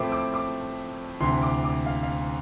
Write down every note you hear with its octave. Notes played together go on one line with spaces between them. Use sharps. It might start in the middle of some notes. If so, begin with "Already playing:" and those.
Already playing: A2 F3 A3 C4 D6
D6
D6
D2 C3 E3 C6
D6
D6
F5
F5